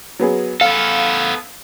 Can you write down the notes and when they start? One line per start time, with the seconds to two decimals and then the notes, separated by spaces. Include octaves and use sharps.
0.19 F#3 B3 G#4
0.61 B3 A4 F5